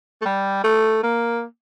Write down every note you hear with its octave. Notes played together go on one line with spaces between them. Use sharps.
A3
G3
A3
A#3